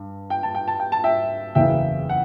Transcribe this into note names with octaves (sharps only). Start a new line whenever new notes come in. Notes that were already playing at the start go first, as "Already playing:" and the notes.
Already playing: G2
G5
A5
G5
A5
G5
A5
E5 G5
F#1 E2 C#3 E3 E5 G5
F#5